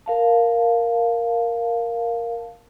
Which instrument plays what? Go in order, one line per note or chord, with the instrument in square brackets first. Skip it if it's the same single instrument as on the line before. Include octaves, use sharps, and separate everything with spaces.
[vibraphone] A#4 F5 A5